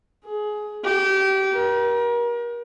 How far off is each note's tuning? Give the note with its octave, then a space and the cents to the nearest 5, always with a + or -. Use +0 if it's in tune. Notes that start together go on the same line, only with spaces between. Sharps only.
G#4 +20
G4 -25
A#4 +35